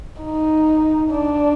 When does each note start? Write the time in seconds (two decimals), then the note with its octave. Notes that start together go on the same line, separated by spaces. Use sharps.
0.22 D#4
1.10 D4